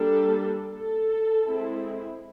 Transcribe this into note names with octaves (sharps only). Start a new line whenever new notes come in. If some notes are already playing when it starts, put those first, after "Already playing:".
Already playing: G3 A#3 D4 A4
A4
G#3 C4 E4